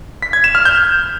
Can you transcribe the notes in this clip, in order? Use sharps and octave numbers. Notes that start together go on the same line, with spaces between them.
B6
G#6
E7
F6
G6